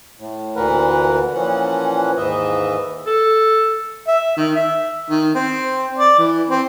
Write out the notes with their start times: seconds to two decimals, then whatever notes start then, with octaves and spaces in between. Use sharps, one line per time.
0.19 A2
0.56 D2 A#2 E3 A#4 B4 F#5
1.34 A#2 E3 F3 C#4 F#5
2.17 D#2 G#2 E3 D#5 E5
3.07 A4
4.08 E5
4.37 D#3
4.56 E5
5.10 D#3
5.35 C4
5.97 D5
6.19 E3
6.49 C4